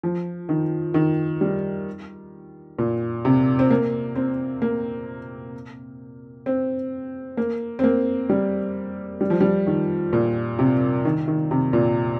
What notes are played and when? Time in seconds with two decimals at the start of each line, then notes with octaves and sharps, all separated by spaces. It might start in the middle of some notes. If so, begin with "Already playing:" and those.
0.03 F3
0.49 D#3
0.94 D#3
1.41 G3
2.79 A#2
3.25 C3
3.59 C4
3.70 A#3
4.16 C4
4.62 A#3
6.46 C4
7.37 A#3
7.79 C4
7.84 A#3
8.30 G3
9.21 G3
9.30 F3
9.40 G3
9.67 D#3
10.13 A#2
10.59 C3
11.05 D#3
11.28 D#3
11.51 C3
11.73 A#2